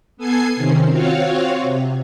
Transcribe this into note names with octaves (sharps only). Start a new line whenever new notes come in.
B3 A4 G#5 G#6 C7
C3 D#3 C4 C#4
C4 F4 F#4 C#5 F5
C3